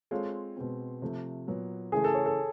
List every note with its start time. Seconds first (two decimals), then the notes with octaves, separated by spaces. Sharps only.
0.11 G#3 C4 F4 A4 C#5
0.57 B2 G#3 C4
1.02 C3 F3 A3
1.47 A#2 F#3 B3
1.92 C#3 E3 A3 G#4
2.04 A4
2.15 C#5
2.26 A4